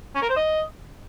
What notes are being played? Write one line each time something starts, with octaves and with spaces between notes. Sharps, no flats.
C#4
A#4
C5
D#5